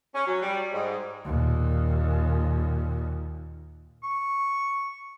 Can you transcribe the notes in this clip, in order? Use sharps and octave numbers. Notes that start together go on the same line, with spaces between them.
C#4
F#3
G3
G#2
D#2 A#2
C#6